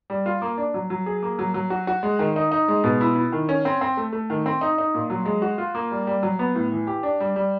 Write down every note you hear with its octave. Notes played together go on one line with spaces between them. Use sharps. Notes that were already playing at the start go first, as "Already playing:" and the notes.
G3
F4
A#3
D4
F#3
F#3
G#4
A#3
F#3
F#3
F#4
F#4
G#3
D#3
D#4
D#4
G#3
B2
E4
E4
D#3
C#4
C4
C4
A3
A3
D#3
C4
D#4
D#4
A#2
F#3
G#3
F#4
F4
A#3
G3
G3
F#3
B3
A2
E3
G4
D4
G3
G3